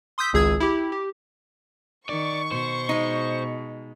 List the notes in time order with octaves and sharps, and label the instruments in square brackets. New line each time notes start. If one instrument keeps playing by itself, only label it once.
[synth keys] C6 D#6 E6 G6 B6
G#1 C#2 G#4 E6 G#6
E4 G4
G4
[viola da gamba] D#3 [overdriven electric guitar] D5 [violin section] C#6
[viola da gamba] B2 [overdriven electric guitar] C5
[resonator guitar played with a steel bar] G#3 D#4